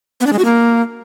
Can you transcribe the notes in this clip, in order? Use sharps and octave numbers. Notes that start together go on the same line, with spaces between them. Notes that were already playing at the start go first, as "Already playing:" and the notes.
B3
D4
G#3
F#4
A#3